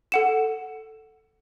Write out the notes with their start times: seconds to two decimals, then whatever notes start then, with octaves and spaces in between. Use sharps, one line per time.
0.12 A4 F#5 E7